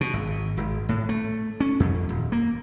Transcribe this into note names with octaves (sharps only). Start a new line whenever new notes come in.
B2
G#1
G#1
A2
A3
C#4
F2
D#1
A#3